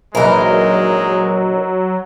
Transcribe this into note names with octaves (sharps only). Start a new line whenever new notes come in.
A#1 E3 F#3 G#3 D#4 A#4 B4